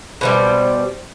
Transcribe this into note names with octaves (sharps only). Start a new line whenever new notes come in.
B2 D#3 G3 C5